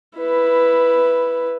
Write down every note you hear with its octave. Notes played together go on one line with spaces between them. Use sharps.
E4 B4